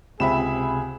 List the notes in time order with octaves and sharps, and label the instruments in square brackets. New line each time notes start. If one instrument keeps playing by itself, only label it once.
[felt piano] C#2 [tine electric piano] C3 C4 [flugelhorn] G#4 [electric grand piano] E5 B5 E7